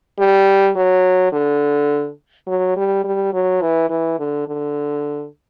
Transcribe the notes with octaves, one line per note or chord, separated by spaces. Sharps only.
G3
F#3
D3
F#3
G3
G3
F#3
E3
E3
D3
D3